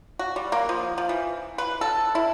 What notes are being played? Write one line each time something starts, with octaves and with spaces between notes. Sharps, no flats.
F#4
G3
A#3
F3
F3
E3
B4
A4
E4